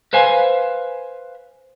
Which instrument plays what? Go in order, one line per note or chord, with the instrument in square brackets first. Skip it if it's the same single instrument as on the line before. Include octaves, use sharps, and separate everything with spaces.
[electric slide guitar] B4 C5 F5 G#5